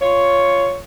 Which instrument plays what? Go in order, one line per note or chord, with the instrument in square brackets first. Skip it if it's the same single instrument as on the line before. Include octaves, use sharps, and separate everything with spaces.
[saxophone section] F4 C#5